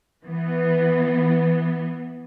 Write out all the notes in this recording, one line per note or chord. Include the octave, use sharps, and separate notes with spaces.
E3 B3